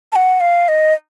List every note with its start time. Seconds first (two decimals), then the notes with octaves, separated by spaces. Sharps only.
0.12 A5
0.16 F#5
0.40 F5
0.68 D#5